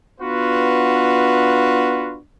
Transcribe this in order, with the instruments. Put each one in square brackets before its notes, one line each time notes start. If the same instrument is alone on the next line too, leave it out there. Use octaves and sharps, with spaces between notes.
[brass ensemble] B3 D4 F4 F#4 B4